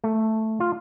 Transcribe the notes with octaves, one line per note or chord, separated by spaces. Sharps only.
A3
F4